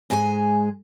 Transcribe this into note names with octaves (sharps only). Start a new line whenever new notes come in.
G#2 G#3 G#4 B4 G#5